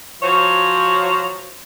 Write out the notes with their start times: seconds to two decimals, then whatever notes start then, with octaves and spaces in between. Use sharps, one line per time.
0.22 F3 F#3 C5 C#5